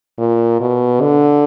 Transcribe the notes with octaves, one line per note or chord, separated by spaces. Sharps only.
A#2
B2
D3